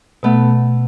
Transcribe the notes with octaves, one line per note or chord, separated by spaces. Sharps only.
B2 A3 B3